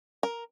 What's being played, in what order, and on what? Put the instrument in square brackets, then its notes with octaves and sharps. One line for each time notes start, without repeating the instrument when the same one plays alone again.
[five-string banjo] A#4